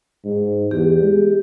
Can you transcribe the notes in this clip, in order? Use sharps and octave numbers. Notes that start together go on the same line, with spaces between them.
G#2
E2 G4
G#3